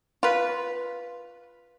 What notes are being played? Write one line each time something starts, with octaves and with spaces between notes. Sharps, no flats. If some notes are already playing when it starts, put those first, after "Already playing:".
F4 B4